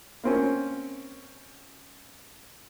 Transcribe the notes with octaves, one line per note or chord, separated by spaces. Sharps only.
A#3 C4 C#4